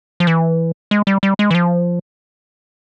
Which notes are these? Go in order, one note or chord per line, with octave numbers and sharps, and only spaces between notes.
F3
E3
G#3
G3
G3
G#3
E3
F3